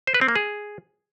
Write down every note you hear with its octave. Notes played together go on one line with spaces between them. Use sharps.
C5
B4
C4
A#3
G#4